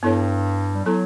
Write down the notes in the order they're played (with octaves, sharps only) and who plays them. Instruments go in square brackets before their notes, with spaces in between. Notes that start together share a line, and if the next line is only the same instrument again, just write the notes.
[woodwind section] G2 [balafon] B3 E4 A4 C#5
[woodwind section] G3
[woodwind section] F#3 [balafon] B3 E4 A4 C#5